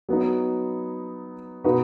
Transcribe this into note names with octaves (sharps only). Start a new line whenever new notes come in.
F#3 B3 D#4
B2 B3 D#4 F#4 B4